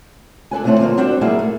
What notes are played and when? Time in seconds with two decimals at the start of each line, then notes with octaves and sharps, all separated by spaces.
0.51 D4 A4 B4 G#5
0.64 E2 C3 A3 C4 E4 C#5
0.79 D3 F3 A3 A#3 C4
0.97 G3 C4 D4 F#4 C5 G5
1.21 F#3 G3 A#3 E4 G#4
1.39 A3